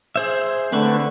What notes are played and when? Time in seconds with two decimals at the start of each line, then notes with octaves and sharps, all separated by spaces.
0.16 G#4 C5 E5
0.72 D3 A3 C4 B4 C#6